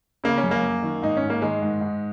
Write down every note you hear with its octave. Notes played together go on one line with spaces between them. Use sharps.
C#3 A#3
C#4
F#2
A#3
F#2
D#3
G#2 D#4
C#4
G#2
A#3
D#3 G#3
G#2
G#2